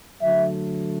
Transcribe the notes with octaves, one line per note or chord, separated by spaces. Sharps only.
D3 F#3 A3 E5